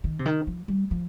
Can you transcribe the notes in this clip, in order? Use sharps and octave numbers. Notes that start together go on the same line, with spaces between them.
D#3
C3
D#3
F3
G3
F3